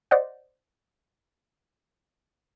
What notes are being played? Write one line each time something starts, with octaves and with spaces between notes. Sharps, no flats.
C5 D5 D#5 F#5